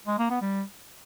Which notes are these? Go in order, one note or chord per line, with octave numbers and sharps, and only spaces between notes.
G#3
A#3
B3
G3